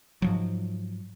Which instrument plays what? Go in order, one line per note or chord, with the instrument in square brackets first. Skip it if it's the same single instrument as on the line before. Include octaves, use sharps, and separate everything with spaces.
[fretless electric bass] G#2 F3 F#3